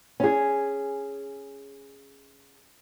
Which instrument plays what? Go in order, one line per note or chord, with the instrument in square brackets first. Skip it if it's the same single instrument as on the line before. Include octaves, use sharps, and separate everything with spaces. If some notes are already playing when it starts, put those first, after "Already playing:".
[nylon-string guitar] C#4 G#4